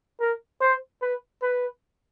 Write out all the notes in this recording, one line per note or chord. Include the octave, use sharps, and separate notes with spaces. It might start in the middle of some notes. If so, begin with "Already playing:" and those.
A#4
C5
B4
B4